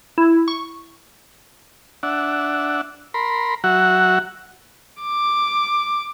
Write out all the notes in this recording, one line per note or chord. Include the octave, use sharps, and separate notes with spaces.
E4
C#6
D4 E5 F#5
A#4 B5 C6
F#3 F#4 E5 F#5
D6